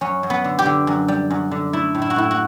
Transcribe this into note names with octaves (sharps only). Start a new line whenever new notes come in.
F#2 C#4
F#2
B3
D3
G4
D3
F#2
G3
F#2
D3
A3 E4
A2
E4
F#4
A2 E4
F#4